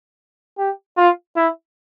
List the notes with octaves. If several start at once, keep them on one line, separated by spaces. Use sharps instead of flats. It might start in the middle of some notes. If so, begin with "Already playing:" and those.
G4
F4
E4